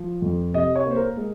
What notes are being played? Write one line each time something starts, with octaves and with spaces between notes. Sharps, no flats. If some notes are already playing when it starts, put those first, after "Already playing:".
Already playing: F3
F2
C3 D#5
C#5
A#3
C5
A#4
G#3